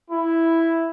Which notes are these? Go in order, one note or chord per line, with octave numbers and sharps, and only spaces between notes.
E4